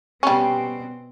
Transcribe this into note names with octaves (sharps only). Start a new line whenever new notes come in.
B2 G3 C4 C#4